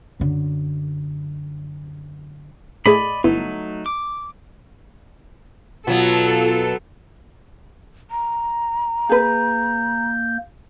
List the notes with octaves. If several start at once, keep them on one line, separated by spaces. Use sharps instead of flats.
F#2 D3
A2 A3 G#4 D5 D#5 B5
G1 F#3 A3 B3 D#4 E4
D6
B2 F#3 B3 F4 A4
A#5
A#3 G#4 B4 G6